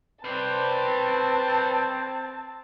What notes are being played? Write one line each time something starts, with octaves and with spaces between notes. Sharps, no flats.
C4 B4 C5 D5 A5